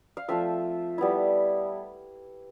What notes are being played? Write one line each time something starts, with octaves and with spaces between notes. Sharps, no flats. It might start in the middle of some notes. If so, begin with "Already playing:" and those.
F5
F3 A3 C4 F4 E5
G3 B3 E4